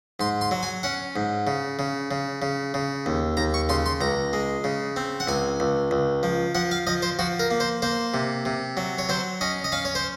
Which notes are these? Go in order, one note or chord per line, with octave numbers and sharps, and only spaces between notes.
G#2 C6
C6
F#3
G#5
C#4 F#5
G#2
C#3
C#3
C#3
C#3
C#3
D#2
D#2 A#5
C#6
C#3 C6
C6
C#2 A#5
G#3
C#3
C4
F#5
C#2 G#5
C#2
C#2
F3
F3 F#5
F5
F3 D#5
C5
F3 F#4
A#4
A#3
C5
A#3 C5
C3
C3
F#3
C#5
F#3 C5
C#4 D#5
D#5
C#4 F5
C#5
C5